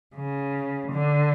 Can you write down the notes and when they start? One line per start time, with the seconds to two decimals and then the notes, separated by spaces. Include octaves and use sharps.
0.16 C#3
0.92 D3